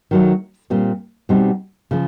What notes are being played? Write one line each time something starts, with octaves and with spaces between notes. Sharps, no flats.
D#3 F#3 A3
A#2 G3 C4
B2 G3 C4 D#4
C#3 F3